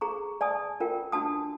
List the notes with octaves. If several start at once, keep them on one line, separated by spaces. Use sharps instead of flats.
G#4 A#5 C#6
D5 G#5 A5 D#6
F4 A#4 G5
D4 F#4 A5 D#6